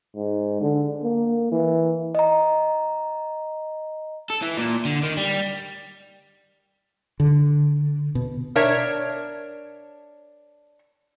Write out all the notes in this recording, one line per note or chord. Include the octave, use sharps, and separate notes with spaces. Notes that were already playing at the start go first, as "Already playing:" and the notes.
G#2
D3
A#3
E3
D#5 A#5
A4
E3
A#2
D3
D#3
G3
D3
B2
D4 A#4 C#5 E5